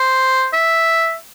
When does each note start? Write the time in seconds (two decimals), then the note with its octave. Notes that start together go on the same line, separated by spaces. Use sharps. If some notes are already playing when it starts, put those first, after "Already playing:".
Already playing: C5
0.53 E5